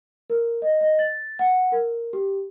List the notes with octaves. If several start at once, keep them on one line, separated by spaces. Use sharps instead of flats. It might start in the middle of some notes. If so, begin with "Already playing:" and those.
A#4
D#5
D#5
A6
F#5
A#4
G4